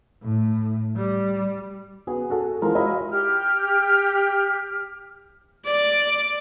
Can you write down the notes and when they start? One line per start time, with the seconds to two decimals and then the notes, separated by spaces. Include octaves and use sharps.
0.23 A2
0.96 G3
2.07 B3 F#4 G#4
2.30 F#4 A4
2.62 E3 F3 G#3 A#4 C5
2.75 E4 F#4 D#5 F5
3.10 G4 F6
5.66 D5